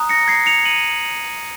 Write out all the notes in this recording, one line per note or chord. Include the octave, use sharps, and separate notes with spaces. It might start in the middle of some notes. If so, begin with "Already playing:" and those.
Already playing: A#5 D#6 F#6
A#6 C#7
G#6 C7
C#7 F7
D#7 F#7